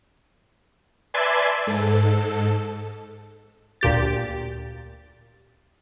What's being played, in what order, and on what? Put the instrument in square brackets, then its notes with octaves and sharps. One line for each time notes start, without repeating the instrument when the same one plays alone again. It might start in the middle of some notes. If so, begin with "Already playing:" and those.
[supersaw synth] B4 D5 E5 G#5 A5 C6
G#2 A4
[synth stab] D2 A#2 G4 A6